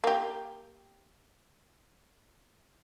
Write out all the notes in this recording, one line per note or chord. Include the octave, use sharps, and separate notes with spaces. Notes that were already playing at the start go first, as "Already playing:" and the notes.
A#3 G4